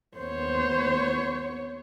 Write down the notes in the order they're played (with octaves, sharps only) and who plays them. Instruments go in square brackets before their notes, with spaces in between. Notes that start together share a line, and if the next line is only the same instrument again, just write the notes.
[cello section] D#2 C5 [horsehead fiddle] B3 C#5